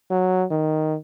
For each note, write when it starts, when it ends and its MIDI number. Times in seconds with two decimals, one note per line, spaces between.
0.10 0.45 54
0.51 0.96 51